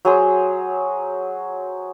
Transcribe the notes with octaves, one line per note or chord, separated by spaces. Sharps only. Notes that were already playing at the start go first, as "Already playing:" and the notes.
F#3 G#4 C5